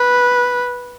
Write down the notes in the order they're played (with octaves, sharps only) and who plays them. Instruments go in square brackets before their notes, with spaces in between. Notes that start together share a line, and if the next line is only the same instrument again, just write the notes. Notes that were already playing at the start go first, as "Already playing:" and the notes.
Already playing: [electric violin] B4